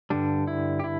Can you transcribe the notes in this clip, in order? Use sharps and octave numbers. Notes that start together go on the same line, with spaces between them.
G2 D3 G3 D4
E4
G4
E4